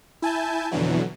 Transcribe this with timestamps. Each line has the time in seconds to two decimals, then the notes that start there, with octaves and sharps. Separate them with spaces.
0.22 E4 G#5 A5 G6
0.71 F2 B2 D3 E3 F#3